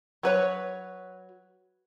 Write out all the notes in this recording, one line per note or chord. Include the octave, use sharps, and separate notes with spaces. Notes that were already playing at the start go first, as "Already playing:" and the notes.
F#3 B4 C#5